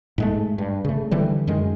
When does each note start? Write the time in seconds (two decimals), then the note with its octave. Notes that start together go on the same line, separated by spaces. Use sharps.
0.18 G#2 G#3 A3
0.58 G2
0.85 C#3 A3
1.11 D3 E3 G3
1.47 F#2 D#3 G#3